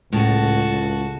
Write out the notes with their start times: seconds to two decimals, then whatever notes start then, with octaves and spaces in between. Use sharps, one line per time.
0.12 C#2 A2 F#4 A5